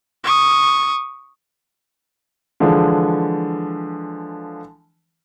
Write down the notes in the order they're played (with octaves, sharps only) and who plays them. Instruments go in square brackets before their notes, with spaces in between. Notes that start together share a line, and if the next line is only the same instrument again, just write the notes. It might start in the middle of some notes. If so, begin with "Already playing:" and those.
[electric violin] C#6 D#6
[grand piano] D3 E3 F3 G#3